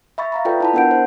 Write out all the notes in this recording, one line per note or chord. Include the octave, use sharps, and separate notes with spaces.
E5 B5 C#6 A6
F5 A#5 B5
F4 A4 B4 D5 G5
E4 A5 B5
B3 D4 A#4 F#5 G6 D7
C5